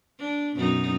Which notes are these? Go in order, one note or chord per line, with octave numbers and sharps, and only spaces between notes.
D4
F#2 B2 D#4